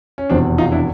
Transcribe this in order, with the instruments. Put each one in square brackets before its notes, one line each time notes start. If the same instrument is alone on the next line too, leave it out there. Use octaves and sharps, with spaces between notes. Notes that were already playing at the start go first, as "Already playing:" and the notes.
[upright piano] C#4
[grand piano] F1 E2 B2 [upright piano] C4 D4
[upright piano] D#4 F4
D4 E4